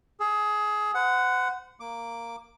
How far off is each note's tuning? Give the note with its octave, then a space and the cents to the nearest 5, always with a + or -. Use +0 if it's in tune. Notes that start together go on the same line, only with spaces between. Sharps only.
G#4 +20 E6 +0
C5 -40 F#5 +0
A#3 -5 D6 +0